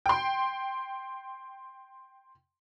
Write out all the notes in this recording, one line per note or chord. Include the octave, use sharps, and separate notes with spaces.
G5 C6